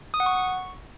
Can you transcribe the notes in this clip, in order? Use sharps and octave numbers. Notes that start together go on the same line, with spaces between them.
D#6
F#5
C#6